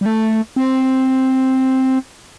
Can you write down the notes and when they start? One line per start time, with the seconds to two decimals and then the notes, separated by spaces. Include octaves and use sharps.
0.01 G3
0.06 A3
0.56 C4